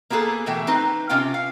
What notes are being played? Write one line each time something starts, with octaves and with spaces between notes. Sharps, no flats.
A#3 B3 F#4 G#4 A4
B2 E3 A3 G5
C4 D#4 B4
C3 C#4 F4 F5 G5
F5